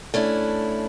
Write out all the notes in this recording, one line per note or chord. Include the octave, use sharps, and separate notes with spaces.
A3 C#4 D4 E4